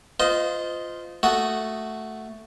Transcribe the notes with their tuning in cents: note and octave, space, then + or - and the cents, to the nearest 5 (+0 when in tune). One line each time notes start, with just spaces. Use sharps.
F4 +0 C5 -30 D#5 +0
A3 +0 F#4 +0 D#6 +0